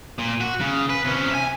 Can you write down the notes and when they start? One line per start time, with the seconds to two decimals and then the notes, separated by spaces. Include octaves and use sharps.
0.18 A#2
0.41 F#4
0.60 C#3
0.90 B4
1.05 C3 C#4
1.31 E5 G#5